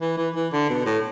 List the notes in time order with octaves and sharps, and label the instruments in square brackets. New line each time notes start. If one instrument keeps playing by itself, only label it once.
[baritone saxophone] E3
E3
E3
D3
B2
A2